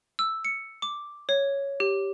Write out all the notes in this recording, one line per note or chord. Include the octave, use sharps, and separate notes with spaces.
E6
C#7
D6
C#5
G4